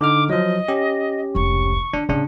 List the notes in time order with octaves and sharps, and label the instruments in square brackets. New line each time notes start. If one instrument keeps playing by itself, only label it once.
[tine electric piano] D3 D#4 F6 [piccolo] D6
[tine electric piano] F3 F#3 [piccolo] D#5
[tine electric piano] C#4 G4
[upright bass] F1 C#2 [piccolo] C#6
[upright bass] D#3 F3 [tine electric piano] D4
[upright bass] A2 [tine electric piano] C#3 D4